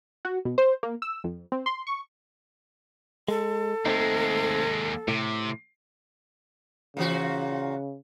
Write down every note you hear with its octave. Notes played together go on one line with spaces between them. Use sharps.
F#4
B2
C5
A#3
E6
F2
C4
C6
C#6
G#3 A4
D#2 G#3 A3 C4 D#4
A2 C3
A#2 C#3 E3 F#4